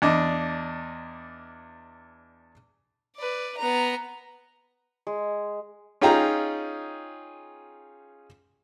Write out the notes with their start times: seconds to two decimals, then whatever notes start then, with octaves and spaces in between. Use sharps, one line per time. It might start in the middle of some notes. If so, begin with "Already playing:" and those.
0.02 E2 D4 D#5
3.17 B4 D5
3.58 B3 A#5
5.07 G#3
6.01 C#4 D#4 F4 G#4 G5 A#5